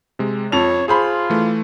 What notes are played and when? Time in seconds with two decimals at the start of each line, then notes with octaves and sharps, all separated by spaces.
0.19 C3 G#3
0.52 F2 C#5 A5 F7
0.88 F4 G#4 C5 B5
1.30 E3 A3